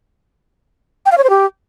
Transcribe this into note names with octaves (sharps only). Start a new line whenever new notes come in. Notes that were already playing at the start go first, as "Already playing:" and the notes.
G5
F5
C#5
C5
G4